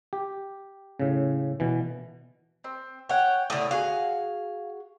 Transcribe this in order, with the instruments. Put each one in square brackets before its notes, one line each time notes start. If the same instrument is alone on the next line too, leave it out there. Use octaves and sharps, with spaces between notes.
[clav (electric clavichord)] G4
A2 C#3
B2 E3
[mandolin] C4
[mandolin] C#5 F#5 [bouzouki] G5
[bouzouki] A2 D3 [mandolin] D#6
[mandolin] F#4 G#4 [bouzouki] F5